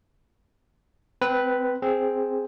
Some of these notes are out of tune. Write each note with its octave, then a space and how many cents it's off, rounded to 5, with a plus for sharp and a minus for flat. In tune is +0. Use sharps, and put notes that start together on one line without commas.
C4 -20 B4 +0
C4 +0 G#4 +0